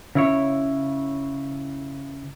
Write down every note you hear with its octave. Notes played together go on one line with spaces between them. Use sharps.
C#3 E4 C#5